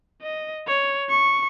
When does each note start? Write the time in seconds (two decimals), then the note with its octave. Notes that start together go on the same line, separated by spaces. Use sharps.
0.22 D#5
0.67 C#5
1.10 C#6